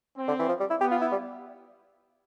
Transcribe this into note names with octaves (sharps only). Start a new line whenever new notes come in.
C4
D3
E3
F3
G3
E4
B3 G4
F4
E4
G3